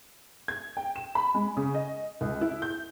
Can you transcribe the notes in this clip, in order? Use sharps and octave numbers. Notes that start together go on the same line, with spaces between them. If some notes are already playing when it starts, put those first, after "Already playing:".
G#6
G5
E7
B5
G#3
C#3
D#5
C#2
E4
G6